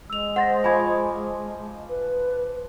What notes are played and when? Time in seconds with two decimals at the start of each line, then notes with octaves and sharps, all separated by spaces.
0.10 G#3 E6 F7
0.36 C5 F#5 A6 A#6
0.64 F3 G#5 B5 C#6 D6 G#6
1.89 B4